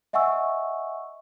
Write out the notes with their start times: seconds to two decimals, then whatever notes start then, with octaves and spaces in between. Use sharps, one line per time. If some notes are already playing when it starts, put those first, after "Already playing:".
0.13 D#5 E5 F#5 G#5 C#6 E6